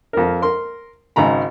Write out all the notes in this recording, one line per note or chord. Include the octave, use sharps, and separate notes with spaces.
F2 A#4
A#4 C6
G#1 G#2 C#3 A#5 B5